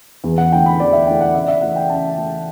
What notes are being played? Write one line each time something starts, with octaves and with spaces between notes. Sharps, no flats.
E2
F#5
D3 A3 E4 G5
B5
E2 D5
E5
D3 A3 E4 G5
F#5
C#3 E5
D5
E5
E3 A3 F#5
G5
C#3 A5
E3 A3